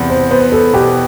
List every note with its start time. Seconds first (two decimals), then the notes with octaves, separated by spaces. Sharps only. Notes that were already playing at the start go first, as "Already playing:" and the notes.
Already playing: E2 C3
0.10 C5
0.31 B3 C5
0.52 A4
0.73 B2 G4